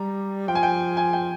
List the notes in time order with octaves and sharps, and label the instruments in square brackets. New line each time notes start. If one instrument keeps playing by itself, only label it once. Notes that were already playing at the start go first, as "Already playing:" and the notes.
Already playing: [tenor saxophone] G3 [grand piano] A#5
[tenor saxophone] F3 [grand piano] G5
[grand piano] G#5
G5
G#5
G5